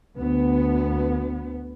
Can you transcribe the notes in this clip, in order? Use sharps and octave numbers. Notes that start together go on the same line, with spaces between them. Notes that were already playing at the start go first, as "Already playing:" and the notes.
D2 B3